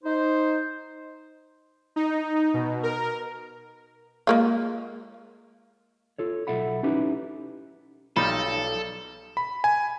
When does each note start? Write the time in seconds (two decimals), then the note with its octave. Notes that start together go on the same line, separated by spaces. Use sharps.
0.04 D#4 C5
1.96 D#4
2.54 B2
2.83 A#4
4.27 G#3 A#3 F4
6.18 F4 A4 C#5
6.47 B1 F#2 A4 E5 F#5 B5
6.83 C#4 D#4 E4 G4 B4
8.17 B1 G3 D#4 F4 A4 B5
9.37 B5
9.64 G#5